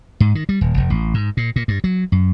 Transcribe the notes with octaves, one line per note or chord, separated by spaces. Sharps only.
G#2
D#3
G3
D#1
F1
A1
G#2
A#2
A#2
G2
F#3
F#2